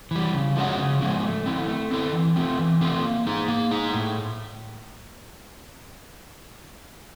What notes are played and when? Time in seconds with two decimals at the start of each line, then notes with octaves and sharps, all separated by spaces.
0.11 E3 G3
0.33 C#3
0.56 F3 G#3 C#4 F#4
0.78 C#3
1.01 F3 G#3 C#4 F#4
1.23 A3
1.46 C4 E4 A4
1.68 A3
1.91 C4 E4 A4
2.13 E3
2.36 A3 C4 F4
2.59 E3
2.81 A3 C4 F4
3.03 A#3
3.26 D#4 G#4
3.48 A#3
3.71 D#4 G#4
3.94 A2